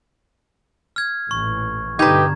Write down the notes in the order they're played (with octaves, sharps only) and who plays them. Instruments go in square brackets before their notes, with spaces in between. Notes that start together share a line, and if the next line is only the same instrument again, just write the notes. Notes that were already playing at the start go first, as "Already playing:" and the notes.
[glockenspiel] F6 G#6
[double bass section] A1 A#2 E3 [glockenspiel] C#6
[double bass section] G2 B2 D3 [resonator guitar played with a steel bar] D#4 B4 [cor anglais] G4 [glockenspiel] A#5 G#6